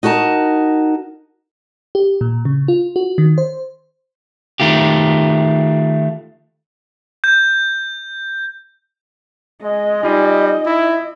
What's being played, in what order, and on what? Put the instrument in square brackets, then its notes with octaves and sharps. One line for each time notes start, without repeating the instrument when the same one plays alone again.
[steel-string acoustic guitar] D#4 F#4 A#4 A5
[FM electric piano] G4
A#2
C#3
F4
F#4
D#3
C5
[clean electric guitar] D#3 A3 F4 G4
[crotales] G6
[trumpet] G#3 [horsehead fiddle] D#5
[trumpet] G3 [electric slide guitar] D#4 F4 G#5
[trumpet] E4